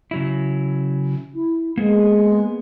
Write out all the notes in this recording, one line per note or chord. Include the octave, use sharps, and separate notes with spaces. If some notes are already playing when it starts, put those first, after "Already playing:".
C#3 F#3 E4
E4
G#3 A#3 B3 G#4